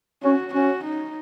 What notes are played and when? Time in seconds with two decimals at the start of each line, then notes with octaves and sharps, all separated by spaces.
0.23 C#4 F#4
0.53 C#4 F#4
0.83 D#4